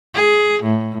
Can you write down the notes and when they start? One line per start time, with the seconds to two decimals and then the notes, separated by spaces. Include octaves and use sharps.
0.14 G#4
0.63 A2